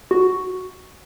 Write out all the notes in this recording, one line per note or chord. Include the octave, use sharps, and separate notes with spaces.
F#4